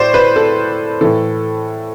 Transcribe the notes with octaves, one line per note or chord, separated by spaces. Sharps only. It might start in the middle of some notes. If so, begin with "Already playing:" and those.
Already playing: A2 C5 D5
B4
A4
A2 E3 A4